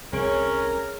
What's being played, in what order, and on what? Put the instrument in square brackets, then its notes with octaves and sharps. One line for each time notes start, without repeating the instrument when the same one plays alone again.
[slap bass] C2 [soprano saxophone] C#4 [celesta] G#4 C#5 D7 [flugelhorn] A#4